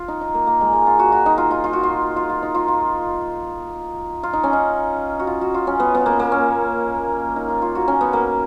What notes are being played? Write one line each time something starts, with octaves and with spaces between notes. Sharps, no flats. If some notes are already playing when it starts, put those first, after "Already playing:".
Already playing: F4
D#4
D#4
A#3
A#3
G#3
G#3
F4
F#4
F#4
D#4
F4
F4
F4
F#4
F4
F4
F4
D#4
F4
F4
F4
D#4
C#4
D#4
F#4
F4
F#4
F4
C#4
B3
B3
A#3
A#3
C#4
D#4
F4
F4
F#4
C#4
B3
A#3